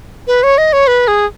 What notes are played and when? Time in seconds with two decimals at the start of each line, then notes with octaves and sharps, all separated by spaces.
0.27 B4
0.43 C#5
0.58 D#5
0.73 C#5
0.87 B4
1.08 G#4